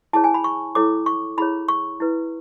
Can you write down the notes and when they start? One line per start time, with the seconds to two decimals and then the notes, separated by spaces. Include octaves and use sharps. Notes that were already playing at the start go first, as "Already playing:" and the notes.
0.13 E4 G#4 C#5 A5
0.24 G#5
0.34 B5
0.44 C#6
0.75 E4 A4 C#5 D6
1.06 C#6
1.38 E4 G#4 C#5 B5
1.68 C#6
2.00 E4 B4